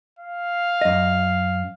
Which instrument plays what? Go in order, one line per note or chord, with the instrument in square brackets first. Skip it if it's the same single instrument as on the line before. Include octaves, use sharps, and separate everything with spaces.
[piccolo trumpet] F5
[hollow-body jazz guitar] F#2 D#5